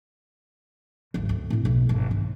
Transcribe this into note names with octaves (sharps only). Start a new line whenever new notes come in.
G#1 D2
D2
A2 C4
B1
G1
D#3